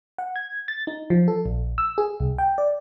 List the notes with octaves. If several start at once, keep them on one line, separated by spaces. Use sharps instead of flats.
F#5
G#6
A6
D#4
F3
A4
A#1
E6
G#4
C2
G5
D5